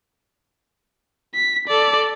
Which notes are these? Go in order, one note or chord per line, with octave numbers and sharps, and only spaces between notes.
B6
A4 D5